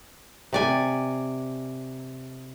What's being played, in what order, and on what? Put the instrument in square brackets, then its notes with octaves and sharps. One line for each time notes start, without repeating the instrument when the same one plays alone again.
[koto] C3 D5 G#5